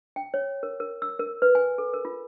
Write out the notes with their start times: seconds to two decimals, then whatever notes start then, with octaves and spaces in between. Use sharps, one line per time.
0.16 G5
0.34 C#5
0.63 A#4
0.80 A#4
1.02 E6
1.19 A#4
1.42 B4
1.55 G#5
1.78 A4
1.93 A#4
2.05 F4